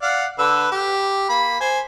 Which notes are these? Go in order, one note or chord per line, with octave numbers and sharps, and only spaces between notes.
D5 F5 F#5
D3 B4 E6
G4
A#3 B5
C5 G#5